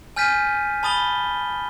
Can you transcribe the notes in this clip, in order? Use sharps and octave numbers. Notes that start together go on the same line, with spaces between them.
G#5 F6 G6 A6 B6 D#7
A5 B5 D#6 A6 G7